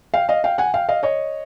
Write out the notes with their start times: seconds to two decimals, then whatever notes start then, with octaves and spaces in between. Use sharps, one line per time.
0.14 F5 G5
0.29 D#5 F5
0.44 F5 G5
0.58 F#5 G#5
0.74 F5 G5
0.89 D#5 F5
1.03 C#5 D#5